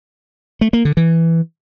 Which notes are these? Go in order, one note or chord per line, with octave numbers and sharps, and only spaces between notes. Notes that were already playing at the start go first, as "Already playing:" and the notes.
A3
A#3
D3
E3